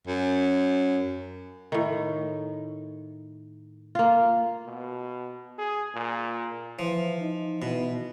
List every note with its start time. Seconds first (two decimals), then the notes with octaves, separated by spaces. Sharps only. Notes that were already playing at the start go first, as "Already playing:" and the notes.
0.07 F#2
1.72 A2 D#3
3.95 A#3 F4
4.66 B2
5.58 G#4
5.95 A#2
6.79 E3 F3
7.21 D#4
7.62 B2 E3